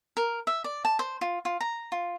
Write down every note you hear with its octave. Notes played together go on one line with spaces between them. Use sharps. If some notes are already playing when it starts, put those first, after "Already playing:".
A#4
E5
D5
A5
C5
F4
F4
A#5
F4